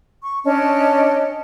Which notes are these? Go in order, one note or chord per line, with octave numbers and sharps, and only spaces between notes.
C#6
C#4 D4 D#5 A5